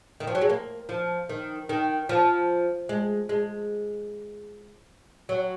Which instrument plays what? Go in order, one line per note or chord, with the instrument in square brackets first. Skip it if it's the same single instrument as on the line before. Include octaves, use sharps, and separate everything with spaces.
[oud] D#3
F3
F#3
G#3
A#3
F3
D#3
D#3
F3
G#3
G#3
F#3